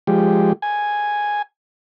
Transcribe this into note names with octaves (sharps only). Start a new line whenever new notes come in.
F3 G#3 G4
G#5